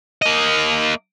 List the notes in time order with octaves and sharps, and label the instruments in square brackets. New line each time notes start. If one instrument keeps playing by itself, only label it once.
[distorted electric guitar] A#3 D#5